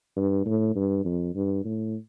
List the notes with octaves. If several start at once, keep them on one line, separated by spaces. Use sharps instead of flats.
G2
A2
G2
F2
G2
A2